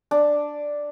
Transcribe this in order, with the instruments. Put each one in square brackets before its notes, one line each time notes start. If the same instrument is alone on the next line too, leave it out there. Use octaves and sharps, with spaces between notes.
[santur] D4